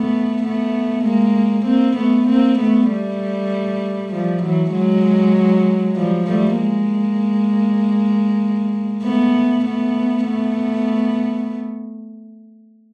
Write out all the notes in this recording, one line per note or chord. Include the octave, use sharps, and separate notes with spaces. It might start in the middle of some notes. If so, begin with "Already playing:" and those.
Already playing: A3 B3
A3 B3
G#3 A#3
A#3 C4
A3 B3
A#3 C4
A3 B3
G3 A3
F3 G3
E3 F#3
F#3 G#3
F3 G3
G3 A3
G#3 A#3
A3 B3
A3 B3
A3 B3